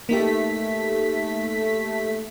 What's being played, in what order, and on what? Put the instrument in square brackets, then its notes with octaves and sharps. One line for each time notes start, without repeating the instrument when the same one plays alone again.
[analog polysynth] A3 B6 [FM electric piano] A#3 D#4 G4